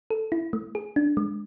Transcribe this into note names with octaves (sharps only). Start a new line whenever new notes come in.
A4
E4
A3
G#4
D4
G#3